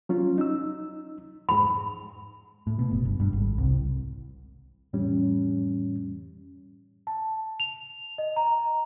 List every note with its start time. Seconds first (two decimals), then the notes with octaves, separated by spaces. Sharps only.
0.09 F#3 C#4 F4
0.38 D#4 E6
1.49 F2 G#2 B5
2.67 A2
2.79 B2
2.91 F#1
3.05 G1
3.20 G2
3.33 G#1
3.58 C2
4.93 F2 A2 E3 G3 C#4
7.07 A5
7.60 F7
8.18 D#5
8.36 A#5